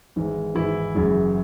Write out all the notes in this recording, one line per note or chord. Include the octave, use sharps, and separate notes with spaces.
G#1 G#2 E3
G#1 G#2 E3 E4
F#1 F#2 C#3 E3